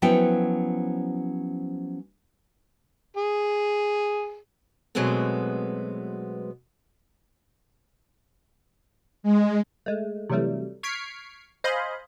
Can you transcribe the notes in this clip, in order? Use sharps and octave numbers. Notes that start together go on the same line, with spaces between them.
F3 F#3 B3 C#4 E4 G5
G#4
B2 F#3 G#3 A3 B3 C4
G#3
G#3 A3
C3 E3 F#3 G3 A3
C#6 F6 G#6 B6 C7 D7
C5 D#5 F5 G#5 B5 C6